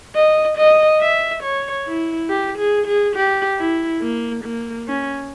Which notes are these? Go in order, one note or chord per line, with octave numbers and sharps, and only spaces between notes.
D#5
D#5
E5
C#5
E4
G4
G#4
G#4
G4
E4
A#3
A#3
C#4